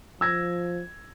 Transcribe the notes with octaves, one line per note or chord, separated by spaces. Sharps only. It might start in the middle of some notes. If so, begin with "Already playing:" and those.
F3 E6 G#6 A#6